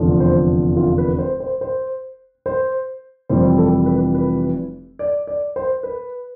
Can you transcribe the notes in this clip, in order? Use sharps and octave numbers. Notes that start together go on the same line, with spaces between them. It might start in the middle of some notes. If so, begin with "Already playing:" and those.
Already playing: F1 E2 D3 F3
C5
F4
B4
C5
C5
C5
C5
F1 F2 E3 G3 C5
A4
B4
B4
D5
D5
C5
B4